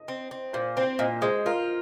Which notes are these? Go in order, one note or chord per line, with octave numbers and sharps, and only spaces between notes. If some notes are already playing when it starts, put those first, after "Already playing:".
Already playing: D#5
C4
C4
A#2 C5
C4 C5
A#2 D#5
G#3 C5
F4 A#4